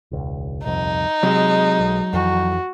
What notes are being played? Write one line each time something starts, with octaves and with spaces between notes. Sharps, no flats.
E1 C#2
D#1 C2 F2 D#4
C3 F#3 G#3
B1
F2 E3 F#4